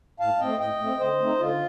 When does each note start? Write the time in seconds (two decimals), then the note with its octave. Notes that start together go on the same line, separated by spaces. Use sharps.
0.20 A2 F5 A5
0.40 A3 C4 D#5 G5
0.60 A2 D#5 G5
0.80 A3 C4
0.99 D3 C5 D#5
1.20 A3 C4 D#4
1.39 D3 F4